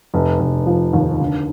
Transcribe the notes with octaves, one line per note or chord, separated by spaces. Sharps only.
F1
F1
F3
D#2
D3